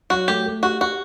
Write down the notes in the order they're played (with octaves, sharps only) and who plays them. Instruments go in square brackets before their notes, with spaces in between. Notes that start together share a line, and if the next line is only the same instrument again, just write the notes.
[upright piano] F#3 [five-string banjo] F#4
[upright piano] A3 [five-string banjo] G4
[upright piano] A3
[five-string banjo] F#4 [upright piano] G4
[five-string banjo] F#4 [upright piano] G4